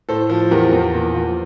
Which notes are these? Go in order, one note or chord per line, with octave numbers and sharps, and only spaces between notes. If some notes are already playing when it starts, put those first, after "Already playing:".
A2 A4 C5
F3
E2 G4 A#4
E2
A#2
F3 F4